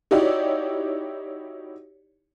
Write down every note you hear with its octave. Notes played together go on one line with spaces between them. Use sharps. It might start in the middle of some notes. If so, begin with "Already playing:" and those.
D#4 E4 F#4 G4 C#5 D5